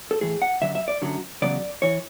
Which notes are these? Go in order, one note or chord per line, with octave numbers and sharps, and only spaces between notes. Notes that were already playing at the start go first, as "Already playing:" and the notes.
A4
A2 E3 G#4
F#5
F#2 D3 F#3 E5
E5
D5
F#2 D3 F#3
E2 C#3 F#3 D5
E3 C#5